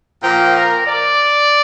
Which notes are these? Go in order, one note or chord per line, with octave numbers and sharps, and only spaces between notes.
A#2 F3 A#3 G5
A#4
D5